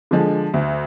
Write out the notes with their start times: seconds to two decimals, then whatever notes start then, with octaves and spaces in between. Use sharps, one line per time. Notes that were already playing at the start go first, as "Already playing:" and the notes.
0.11 D3 F3 G#3
0.54 D2